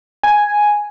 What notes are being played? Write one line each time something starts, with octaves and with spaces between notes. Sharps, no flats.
G#5